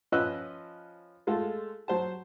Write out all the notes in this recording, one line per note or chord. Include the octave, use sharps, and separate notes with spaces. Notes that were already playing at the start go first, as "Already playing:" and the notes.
F3 C#4 B4 D#5 E6 F#6
G#3 A3 F4 A4
F#3 C5 A5